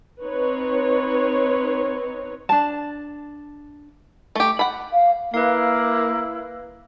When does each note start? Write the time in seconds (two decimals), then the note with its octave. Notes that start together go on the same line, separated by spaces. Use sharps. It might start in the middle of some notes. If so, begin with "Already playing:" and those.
0.23 C4 D#4 B4 C#5
2.49 D4 A5
4.35 A3 G4
4.59 F#5 B5
4.93 F5
5.34 A#3 E4 B4 F5